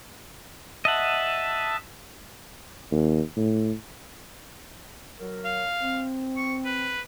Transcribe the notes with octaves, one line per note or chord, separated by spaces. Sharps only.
D#5 E5 F#5 A5
D#2
A2
F#3 A#4
F5
C4
C#6
B4